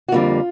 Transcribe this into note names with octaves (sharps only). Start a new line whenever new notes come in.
F#4
F2 D3 G3 A#3 F4